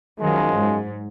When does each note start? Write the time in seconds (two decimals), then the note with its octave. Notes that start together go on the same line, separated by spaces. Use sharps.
0.19 F#2 D#3 F3 F#3 G#3
0.56 G#2